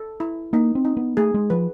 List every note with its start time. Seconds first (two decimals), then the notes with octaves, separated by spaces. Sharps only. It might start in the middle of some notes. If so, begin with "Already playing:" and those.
Already playing: A4
0.20 E4
0.53 A#3 D#4
0.75 C4
0.85 D#4
0.97 B3
1.17 A3 G#4
1.34 G#3
1.50 F3 B4